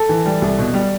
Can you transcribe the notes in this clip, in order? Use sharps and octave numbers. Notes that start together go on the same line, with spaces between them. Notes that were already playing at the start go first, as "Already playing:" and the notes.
Already playing: A4
E3
G3
C2
B2
G3